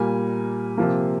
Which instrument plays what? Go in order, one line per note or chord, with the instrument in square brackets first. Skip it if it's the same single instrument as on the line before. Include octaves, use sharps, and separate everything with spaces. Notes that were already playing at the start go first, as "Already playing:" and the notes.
Already playing: [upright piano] A#2 G3 A#3 G#5
C3 F3 A#3